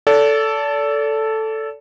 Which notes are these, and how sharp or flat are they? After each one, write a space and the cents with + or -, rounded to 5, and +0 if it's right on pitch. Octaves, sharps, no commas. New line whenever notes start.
A4 +0 D5 -35